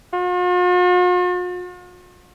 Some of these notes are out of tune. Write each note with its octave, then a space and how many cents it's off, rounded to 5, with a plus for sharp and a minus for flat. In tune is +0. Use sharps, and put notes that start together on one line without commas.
F4 +45